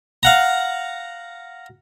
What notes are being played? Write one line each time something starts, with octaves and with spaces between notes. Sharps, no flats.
F5 F#5 A#5